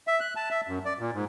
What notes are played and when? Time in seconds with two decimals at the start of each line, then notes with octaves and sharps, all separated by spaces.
0.07 E5
0.20 F#6
0.36 A5
0.51 E5
0.68 F#2
0.85 D5
0.99 A#2
1.14 G#2